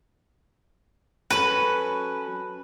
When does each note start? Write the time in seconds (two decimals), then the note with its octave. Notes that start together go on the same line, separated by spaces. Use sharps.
1.30 F#3 C#4 A4 B4